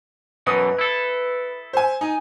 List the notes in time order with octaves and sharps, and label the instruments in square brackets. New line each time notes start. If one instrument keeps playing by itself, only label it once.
[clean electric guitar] F#2 B2 E3 [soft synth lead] B4 [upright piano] D#6
[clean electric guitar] E4 A4
[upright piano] C5 G#5
[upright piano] D#4 [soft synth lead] G#5